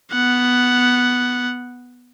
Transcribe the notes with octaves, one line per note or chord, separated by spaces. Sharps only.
B3 F#5